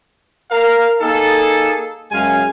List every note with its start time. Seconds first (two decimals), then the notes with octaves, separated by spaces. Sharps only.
0.51 A#4 F5
1.01 A#3 D#4 G#4 A4
2.12 F#2 G#3 C#4 F5 G#5